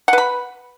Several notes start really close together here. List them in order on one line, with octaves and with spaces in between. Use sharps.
F#5 B4 B5